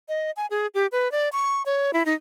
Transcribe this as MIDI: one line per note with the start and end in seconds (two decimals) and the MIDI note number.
0.08 0.31 75
0.37 0.46 80
0.51 0.67 68
0.74 0.87 67
0.92 1.11 71
1.12 1.29 74
1.32 1.62 85
1.66 1.91 73
1.93 2.03 64
2.06 2.14 63